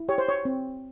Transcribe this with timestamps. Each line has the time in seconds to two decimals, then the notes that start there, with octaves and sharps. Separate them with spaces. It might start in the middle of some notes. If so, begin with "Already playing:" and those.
Already playing: E4
0.09 G4 C#5
0.18 C5
0.28 C#5
0.45 C4